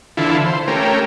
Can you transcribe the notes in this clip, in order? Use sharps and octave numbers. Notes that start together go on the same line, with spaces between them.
D3 E3 E4 F4 A4
C5
A3 C#4 G4 A#4